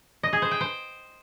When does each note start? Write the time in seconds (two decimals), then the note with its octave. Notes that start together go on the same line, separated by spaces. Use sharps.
0.23 D#5
0.33 G#4
0.42 C5
0.51 G5
0.61 C5